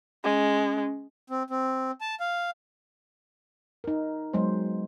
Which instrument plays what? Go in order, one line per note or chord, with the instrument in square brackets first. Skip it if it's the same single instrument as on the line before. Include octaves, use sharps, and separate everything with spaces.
[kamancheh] G#3 [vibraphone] C#4
[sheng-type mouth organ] C4
C4
A5
F5
[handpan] D#4 A#4
F#3 G#3 B3 C5